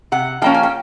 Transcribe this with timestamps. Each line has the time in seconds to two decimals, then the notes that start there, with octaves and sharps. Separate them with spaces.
0.12 C3 F#5
0.42 F3 A#3 C#4 G5
0.54 G#5
0.63 G5